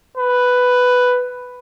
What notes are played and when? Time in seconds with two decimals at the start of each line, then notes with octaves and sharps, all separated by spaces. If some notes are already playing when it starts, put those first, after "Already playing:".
0.17 B4